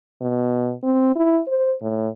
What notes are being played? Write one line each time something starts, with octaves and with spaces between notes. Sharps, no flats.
B2
C4
E4
C5
A2